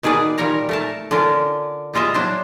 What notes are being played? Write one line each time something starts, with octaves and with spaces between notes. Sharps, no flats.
B2 D#3 G#4 B4 D5
A#2 G3 A#4 C#5 A#5
A3 A#4 A5
D3 C#4 F4 A#4
G3 G#3 F4 D#5 E5
F#3 D4 C5